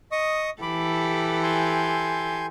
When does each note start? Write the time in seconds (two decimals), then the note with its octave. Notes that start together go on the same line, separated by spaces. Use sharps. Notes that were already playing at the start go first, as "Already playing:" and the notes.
0.12 D#5 C#6 D#6
0.62 E3 G4 A4 B5 D6
1.43 G#5 C6 G6